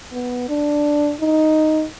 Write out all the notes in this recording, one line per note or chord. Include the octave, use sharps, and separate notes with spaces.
B3
D4
D#4